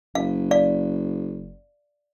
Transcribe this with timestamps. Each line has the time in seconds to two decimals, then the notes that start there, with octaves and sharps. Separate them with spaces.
0.15 F#1 F5
0.51 D5 F5